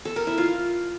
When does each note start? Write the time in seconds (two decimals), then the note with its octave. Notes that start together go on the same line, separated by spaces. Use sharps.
0.05 A4
0.16 A#4
0.27 E4
0.38 F4